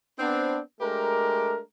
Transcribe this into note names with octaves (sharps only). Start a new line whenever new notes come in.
B3 C4 D4
G#3 A3 D4 G4 A#4